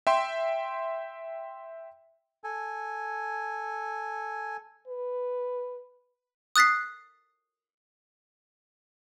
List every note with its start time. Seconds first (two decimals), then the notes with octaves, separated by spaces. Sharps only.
0.07 E5 G5 C6
2.44 A4 G#5
4.88 B4
6.56 D#6 F#6 A6 B6 C7